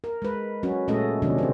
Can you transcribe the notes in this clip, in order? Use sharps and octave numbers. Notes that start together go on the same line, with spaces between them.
A#4
G#3 B4
F#3 C#4 F#4
A#2 G#3 A3 C#4 A4 D#5
C3 D#3 F#3 C#4 D4
C#3 F#3 C4